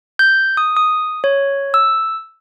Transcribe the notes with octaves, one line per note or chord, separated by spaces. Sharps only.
G6
D#6
D#6
C#5
E6